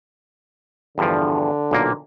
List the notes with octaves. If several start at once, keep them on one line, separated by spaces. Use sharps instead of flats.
E2 G2 D3 F3
B1 A#2 A#3